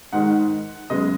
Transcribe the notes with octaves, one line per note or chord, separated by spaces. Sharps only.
G#2 D#3 G#3 F#5
F#2 C#3 G#3 B3 D#5